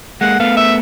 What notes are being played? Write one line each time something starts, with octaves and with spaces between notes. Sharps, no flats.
G#3 A#3 F#5
A3 B3 F5
E5